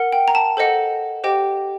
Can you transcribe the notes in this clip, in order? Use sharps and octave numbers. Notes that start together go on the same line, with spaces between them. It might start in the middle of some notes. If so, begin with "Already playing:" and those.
Already playing: A#4 F#5
G5
A#5
A5
A4 C5 D#5 F#5
G4 C5 D#5 G5